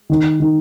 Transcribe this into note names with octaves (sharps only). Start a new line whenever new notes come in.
D#3
D#3